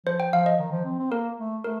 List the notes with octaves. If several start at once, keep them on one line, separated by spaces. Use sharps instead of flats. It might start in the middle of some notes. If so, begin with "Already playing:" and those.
F3 C5
G5
F3 F5
D#5
D#3
F3
C4
C4
A#3 A#4
A3
A3 A#4